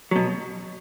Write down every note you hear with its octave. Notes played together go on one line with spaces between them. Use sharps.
B2 F#3